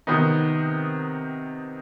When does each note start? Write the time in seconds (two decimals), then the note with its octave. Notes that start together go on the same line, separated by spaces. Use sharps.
0.07 C3 D#3 B3 D#4